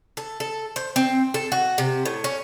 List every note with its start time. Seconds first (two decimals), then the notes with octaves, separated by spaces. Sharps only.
0.17 A4
0.40 A4
0.76 C5
0.96 C4
1.34 A4
1.52 F#4
1.78 C3
2.05 A2
2.24 C#4